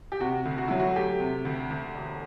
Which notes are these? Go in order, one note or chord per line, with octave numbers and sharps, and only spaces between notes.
G4
C3 F#4
D2
F#4
F#3 E4
F#4
A3 G4
C3
D2
D2
E1